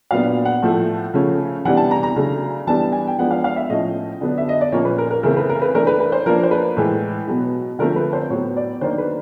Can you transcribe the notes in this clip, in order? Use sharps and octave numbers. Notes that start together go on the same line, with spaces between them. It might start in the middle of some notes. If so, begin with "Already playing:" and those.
A#2 F#3 B3 D4 F5
F#5
A2 F3 A3
C#3 F3 A3 C#4
C3 E3 G3 B3 D4 F#5
A5
A#5
A#5
C#3 F#3 A3 D4
E3 G3 B3 D4 A5
G#5
G5
F3 G#3 B3 D4 F#5
F5
F5
E5
A2 F3 A3 C#4 D#5
D3 F#3 B3 D4
E5
D#5
D5
A#2 F3 A#3 C#4 C#5
B4
A#4
A#4
C#3 E3 A3 C4 A#4
B4
A#4
B4
E3 A3 D4 A#4
B4
B4
C5
F3 A#3 D4 A#4
C5
B4
A2 E3 G#3
B2 F#3 B3
D3 F3 A3 C4 A#4
B4
C5
A2 F#3 B3 C#5
D5
D#3 F#3 A#3 D4 C5
B4